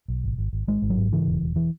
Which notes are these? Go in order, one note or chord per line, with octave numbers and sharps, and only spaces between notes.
B1
G#1
G#1
G#1
G#1 G#3
G#1
F#3
G#2
C#3 E3
E1
E1
E3